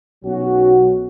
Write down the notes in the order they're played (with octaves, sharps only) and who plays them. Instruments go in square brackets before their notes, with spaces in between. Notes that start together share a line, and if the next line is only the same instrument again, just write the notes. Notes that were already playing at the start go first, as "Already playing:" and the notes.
[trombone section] B1 B2 F#3 C#4 F#4